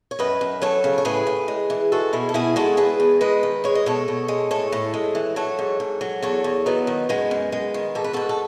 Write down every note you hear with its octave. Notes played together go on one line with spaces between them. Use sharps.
C#5
F#2 B4 D#5
F#2
F#3 A4 C#5
C#3
C#5
A2 G#4 B4
A2
G#3
E3
G#3 F#4 A4
B2 E4 G#4
A4
B2 E4 G#4
G#3 F#4 A4
E2 G#4 B4
E2
G#3 B4 D#5
D#3
G#3 C#5
D#5
B2 A4 C#5
B2
G#3
A2 A4 C#5
A2
G#3
E3
F#3 A4 C#5
G#2
G#2
F#3
E2 A4 C#5
E2
F#3 B3 D#4
D#3
F#2 G#3 B3
F#2
G#3
D#3
G#2 A4
B4
G#2 F#4 A4
A4